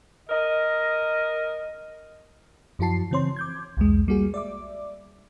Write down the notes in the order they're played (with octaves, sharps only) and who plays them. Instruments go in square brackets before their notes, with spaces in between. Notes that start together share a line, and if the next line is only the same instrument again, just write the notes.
[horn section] A#4 D#5
[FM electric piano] F#2 F3 E4 F#4 A5 C7
C#3 E3 C4 C#5 C6
D6 G6 G#6
B1 E2 G#3
G3 A#3 F#4 G#4
D5 E5 D6